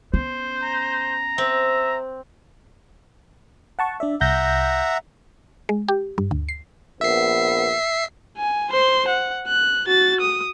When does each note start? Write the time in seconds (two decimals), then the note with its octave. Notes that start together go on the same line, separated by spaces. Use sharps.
0.14 B3 C#4 C5
0.63 A#5
1.38 C4 E5
3.79 F#5 A5 C#6
4.00 D4 D5 E5
4.21 C2 E5 F#5 A#5 G6 A#6
5.69 G#3
5.88 G4
6.18 G2
6.31 D2
6.49 C7
7.01 A#1 B3 E5 C7
8.37 G#5
8.70 C5 C6
9.08 F#5
9.48 F#6
9.87 F#4 A6
10.20 D#6